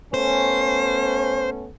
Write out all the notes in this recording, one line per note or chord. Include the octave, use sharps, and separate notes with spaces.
A3 B3 C#4 C5